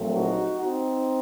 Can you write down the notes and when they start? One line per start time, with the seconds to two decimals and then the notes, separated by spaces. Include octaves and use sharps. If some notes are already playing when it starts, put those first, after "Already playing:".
Already playing: A#1 A#2 F#3 A3 C4
0.16 D#4 F#4
0.61 C4 D#4